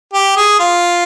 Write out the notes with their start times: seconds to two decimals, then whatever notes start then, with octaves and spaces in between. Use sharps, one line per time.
0.14 G4
0.37 G#4
0.60 F4